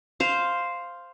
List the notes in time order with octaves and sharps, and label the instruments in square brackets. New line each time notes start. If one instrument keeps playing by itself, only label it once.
[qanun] C5 F5